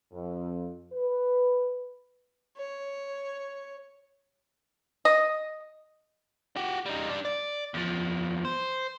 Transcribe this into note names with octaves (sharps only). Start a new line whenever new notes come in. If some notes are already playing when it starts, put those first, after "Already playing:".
F2
B4
C#5
D#5
F#4 G4
G3 D#4
G3 D4
D5
E2 F3
C5